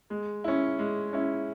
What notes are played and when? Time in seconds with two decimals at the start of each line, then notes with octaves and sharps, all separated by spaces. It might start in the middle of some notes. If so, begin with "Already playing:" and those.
0.10 G#3
0.44 C#4 E4
0.79 G#3
1.13 C#4 E4